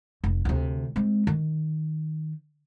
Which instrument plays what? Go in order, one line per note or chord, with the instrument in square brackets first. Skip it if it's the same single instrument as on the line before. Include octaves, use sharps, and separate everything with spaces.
[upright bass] F1
D2 C3
G#3 C4
D#3